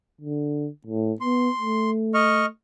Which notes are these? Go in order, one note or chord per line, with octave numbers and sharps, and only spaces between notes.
D3
A2
B3 C6
A3
D#5 C#6 F6